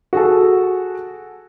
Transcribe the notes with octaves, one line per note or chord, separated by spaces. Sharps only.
F#4 G#4 A4